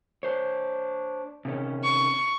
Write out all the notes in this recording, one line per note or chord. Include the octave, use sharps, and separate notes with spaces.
D4 C5 C#5
C3 D#3 C#4
C#6